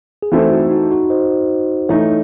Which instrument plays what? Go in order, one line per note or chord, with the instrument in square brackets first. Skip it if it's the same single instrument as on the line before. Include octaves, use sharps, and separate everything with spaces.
[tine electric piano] G#4
[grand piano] E3 A3 C4 E4 A4 [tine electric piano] D#4 F#4
[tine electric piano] D#4 F#4
D#4 F#4
D#4 F#4
C5 D#5
[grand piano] E3 A3 D#4 [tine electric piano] A4 C#5